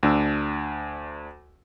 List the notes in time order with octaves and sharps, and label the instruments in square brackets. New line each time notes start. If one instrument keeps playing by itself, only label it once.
[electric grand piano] D2 D4 E6